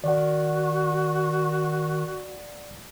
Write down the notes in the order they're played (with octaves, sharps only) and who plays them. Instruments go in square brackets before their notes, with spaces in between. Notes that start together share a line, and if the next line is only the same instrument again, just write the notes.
[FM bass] D#3 [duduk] F#4 [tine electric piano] D5 F#5